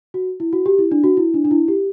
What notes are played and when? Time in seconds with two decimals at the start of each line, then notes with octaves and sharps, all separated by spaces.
0.14 F#4
0.40 E4
0.53 F#4
0.66 G4
0.79 E4
0.91 D4
1.04 F#4
1.17 E4
1.34 D4
1.45 D4
1.51 E4
1.68 G4